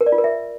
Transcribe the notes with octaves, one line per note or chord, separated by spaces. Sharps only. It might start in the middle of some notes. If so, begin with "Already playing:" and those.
A#4
D5
F4
A#4
E5